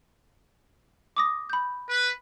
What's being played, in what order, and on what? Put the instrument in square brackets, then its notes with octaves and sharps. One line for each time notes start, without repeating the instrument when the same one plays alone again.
[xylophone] D6 D#6 A#6
B5 G6
[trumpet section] B4